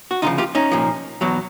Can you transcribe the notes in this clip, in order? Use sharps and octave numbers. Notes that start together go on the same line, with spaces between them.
F#4
D2 C#3 F3 D#4 F4
F4 G4
C#4 D#4
C2 A#2 F3
E2 B2 F#3